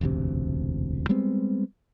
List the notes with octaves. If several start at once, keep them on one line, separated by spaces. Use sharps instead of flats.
E1 A1 D2 C3
G3 G#3 B3 C4